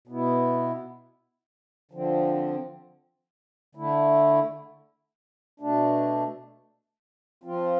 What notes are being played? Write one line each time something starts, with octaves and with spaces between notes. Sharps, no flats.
B2 B3 E4
D3 F3 C4
D3 A3 E4
B2 A3 D4
F3 C4 F4